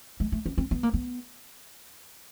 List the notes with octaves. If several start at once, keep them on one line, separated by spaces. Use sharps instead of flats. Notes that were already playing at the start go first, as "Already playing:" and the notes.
G#3
A3
C#4
C4
B3
A#3
B3